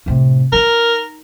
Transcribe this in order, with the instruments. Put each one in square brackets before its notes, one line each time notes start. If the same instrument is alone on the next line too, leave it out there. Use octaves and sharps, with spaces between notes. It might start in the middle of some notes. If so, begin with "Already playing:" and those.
[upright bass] A2 C3
[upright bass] D#4 [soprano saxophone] A#4